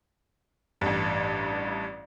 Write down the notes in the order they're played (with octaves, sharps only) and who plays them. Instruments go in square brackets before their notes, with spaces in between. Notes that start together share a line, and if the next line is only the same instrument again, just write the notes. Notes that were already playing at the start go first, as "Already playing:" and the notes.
[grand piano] A1 G2